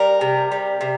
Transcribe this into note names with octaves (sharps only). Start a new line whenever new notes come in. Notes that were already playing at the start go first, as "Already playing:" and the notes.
Already playing: G3 A#4
C3
G3
C3